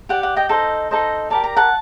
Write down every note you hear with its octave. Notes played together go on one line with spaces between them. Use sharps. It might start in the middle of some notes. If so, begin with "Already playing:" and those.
G4 D5 F#5
F#5
D#5 G5
D#4 A4 C5 D#5
D#4 A4 C5 D#5
G4 A#4 D5 A5
A#5
F#5 A5